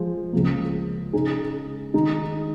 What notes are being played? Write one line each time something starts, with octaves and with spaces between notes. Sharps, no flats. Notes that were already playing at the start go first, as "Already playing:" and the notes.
Already playing: F3 G#3 F4
C#2 C#3 F3 A#3
C#3 G#3 D#4 G#4
D#3 G#3 D#4